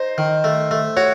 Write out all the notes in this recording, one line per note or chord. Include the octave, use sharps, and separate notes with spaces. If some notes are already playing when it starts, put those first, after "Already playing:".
Already playing: D#4 C5
D#3
A3
A3
F#4 C#5